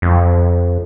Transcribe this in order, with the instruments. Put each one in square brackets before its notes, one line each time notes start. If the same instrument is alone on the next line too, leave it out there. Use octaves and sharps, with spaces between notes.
[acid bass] F2